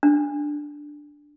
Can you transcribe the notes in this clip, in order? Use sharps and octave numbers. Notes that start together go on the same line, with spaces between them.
D4